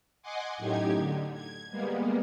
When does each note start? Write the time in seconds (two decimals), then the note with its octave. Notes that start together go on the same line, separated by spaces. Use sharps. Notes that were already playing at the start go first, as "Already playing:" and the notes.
0.22 D#5 F#5 G#5 C6 D6
0.57 F#2 A2 D#4 G4 G#6
0.96 D3
1.34 G#6
1.71 G3 G#3 A#3 B3